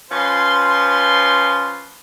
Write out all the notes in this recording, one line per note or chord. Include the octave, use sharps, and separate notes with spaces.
F3 C#4 F4 B4 C5 C6